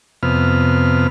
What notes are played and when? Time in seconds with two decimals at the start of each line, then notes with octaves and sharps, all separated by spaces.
0.23 F2 C3 B3 F6